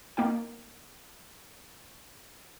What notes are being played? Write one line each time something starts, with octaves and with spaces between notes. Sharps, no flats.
A#3 D#4 G5